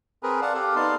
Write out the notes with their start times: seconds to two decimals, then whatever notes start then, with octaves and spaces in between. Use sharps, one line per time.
0.23 C4 G#4 A#4 B4
0.42 D5 F5 F#5 A5
0.54 G4 A4 F5 F#5
0.76 B3 D#4 D5 F5 A5 C6